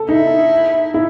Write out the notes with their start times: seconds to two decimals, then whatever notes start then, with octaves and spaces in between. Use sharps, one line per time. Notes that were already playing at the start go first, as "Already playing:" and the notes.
Already playing: A4
0.09 D#4 E4
0.94 E4